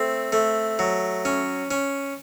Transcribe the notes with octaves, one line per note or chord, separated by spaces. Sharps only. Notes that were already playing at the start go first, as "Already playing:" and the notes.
Already playing: A3 C4
A3
F#3
C#4
C#4